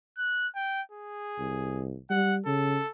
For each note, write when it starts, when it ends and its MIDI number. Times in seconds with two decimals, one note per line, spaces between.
0.18 0.47 90
0.55 0.82 79
0.92 1.86 68
1.39 1.97 36
2.10 2.41 55
2.10 2.35 78
2.46 2.79 49
2.46 2.90 69